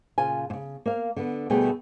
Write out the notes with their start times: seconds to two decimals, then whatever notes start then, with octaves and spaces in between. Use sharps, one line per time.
0.18 A#2 C#3 F4 G#5
0.50 A#2 C#3
0.86 A#3 F5
1.16 D3 B3
1.50 D2 B2 G3 A3 G#4 G5